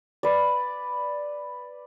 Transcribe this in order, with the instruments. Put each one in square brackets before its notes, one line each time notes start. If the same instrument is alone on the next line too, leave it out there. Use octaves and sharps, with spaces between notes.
[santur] B4 D5